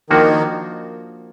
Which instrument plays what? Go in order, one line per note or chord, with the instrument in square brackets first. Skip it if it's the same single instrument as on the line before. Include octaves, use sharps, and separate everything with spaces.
[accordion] D#3 [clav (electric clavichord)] F3 A#3 D4 F#4